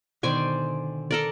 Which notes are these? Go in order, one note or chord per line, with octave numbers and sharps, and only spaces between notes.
B2 D3 D#3 C5 D5 G#5
A4 A#4 D5